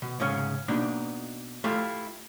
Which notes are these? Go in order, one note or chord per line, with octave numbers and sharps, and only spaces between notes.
B2
C2 G#2 C#3 C#4
B2 A#3 D4 D#4
A3 E4 F4 G4 E5